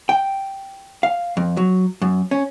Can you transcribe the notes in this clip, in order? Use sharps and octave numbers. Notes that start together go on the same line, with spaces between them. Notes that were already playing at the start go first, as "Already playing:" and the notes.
G5
F5
F2
F#3
F#2
C#4